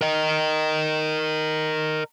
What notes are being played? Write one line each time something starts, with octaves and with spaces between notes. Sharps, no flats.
A#4 D#5